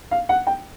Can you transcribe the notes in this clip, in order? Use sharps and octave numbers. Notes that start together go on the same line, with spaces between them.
F5
F#5
G5